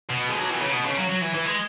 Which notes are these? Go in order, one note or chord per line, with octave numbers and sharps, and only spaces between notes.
B2
G#3
F#3
E3
C#3
B2
C#3
F#3
F#3
E3
E3
G#3